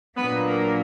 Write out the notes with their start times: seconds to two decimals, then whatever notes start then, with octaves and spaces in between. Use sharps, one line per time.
0.17 A#2 F#3 A#3 B3 D4 B4
0.46 A#4